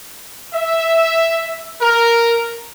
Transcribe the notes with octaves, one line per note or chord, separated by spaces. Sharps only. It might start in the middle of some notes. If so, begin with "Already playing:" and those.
E5
A#4